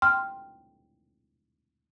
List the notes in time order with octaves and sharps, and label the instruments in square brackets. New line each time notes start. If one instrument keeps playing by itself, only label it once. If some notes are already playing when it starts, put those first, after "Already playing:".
[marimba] G5 C6 F6